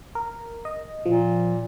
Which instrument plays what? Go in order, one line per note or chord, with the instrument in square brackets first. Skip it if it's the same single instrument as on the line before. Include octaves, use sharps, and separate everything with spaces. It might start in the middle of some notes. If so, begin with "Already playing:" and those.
[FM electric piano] A#4
D#5
[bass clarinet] A#2 [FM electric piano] F3